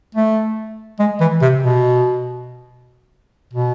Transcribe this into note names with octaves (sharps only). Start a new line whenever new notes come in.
A3
G#3
E3
C3
B2
B2